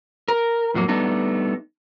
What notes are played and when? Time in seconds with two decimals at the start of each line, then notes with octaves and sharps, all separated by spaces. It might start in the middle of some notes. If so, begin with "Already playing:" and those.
0.28 A#4
0.74 F2 A2 F#3 A#3
0.88 G3 A3 B3 D4 D#4